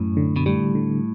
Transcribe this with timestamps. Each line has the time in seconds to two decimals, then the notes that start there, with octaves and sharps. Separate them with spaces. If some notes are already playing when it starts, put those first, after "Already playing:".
Already playing: F#2 A2 C#4
0.17 D3
0.36 B2
0.46 A2 G3
0.75 D3